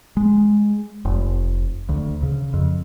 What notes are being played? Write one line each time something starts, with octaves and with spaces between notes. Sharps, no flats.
G#3
F1
D2
C#3
F2